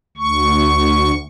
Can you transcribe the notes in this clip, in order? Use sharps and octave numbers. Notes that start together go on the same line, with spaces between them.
D2 C#6